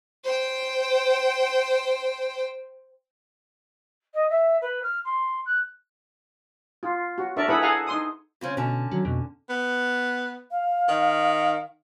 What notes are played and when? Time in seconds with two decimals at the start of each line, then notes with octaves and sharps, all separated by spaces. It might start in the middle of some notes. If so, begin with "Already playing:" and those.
0.24 C5 G5
4.14 D#5
4.30 E5
4.61 B4
4.82 F6
5.04 C6
5.45 F#6
6.83 F4
7.18 F#4
7.36 D4 A4 A#4 D5 E5 C#6
7.48 E4 G#4 A4 B4 F#5 B5
7.61 G#4 A4 F5 F#5 G#5 A#5
7.87 D#4 C6 D#6
8.41 C#3 C4 C#4
8.57 B2 D3 C#4 A5
8.91 D#3 F#3
9.05 F2 B2
9.49 B3
10.51 F5
10.88 D#3